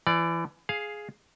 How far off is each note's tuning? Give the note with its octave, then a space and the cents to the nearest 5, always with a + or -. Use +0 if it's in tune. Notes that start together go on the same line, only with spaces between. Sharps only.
E3 +25 D5 +0
G#4 +5 F5 +0